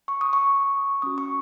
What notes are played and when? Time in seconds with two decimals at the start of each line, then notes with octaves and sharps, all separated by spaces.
0.08 C#6
0.21 D#6
0.33 C#6
1.02 C#4 F#4 D#6
1.18 C#6